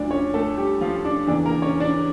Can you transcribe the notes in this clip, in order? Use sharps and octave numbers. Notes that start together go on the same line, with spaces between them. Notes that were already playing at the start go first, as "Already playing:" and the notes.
Already playing: D2 D3 F3 D4 D5
C#4 C#5
A3 A4
G3 G4
F3 F4
D4 D5
E2 C#3 E3 D4 D5
A#3 A#4
C#4 C#5
D4 D5